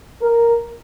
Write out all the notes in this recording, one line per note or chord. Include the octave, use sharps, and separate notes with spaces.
A#4